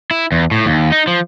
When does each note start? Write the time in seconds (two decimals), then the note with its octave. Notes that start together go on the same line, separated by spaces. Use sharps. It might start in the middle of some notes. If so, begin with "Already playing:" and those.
0.11 E4
0.32 E2
0.51 A2
0.66 D#2
0.92 D#4
1.07 F3